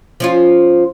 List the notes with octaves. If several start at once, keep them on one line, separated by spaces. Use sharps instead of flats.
F3 C#4 F4